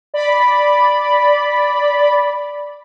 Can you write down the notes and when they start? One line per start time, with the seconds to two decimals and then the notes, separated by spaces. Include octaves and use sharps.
0.14 D5 B5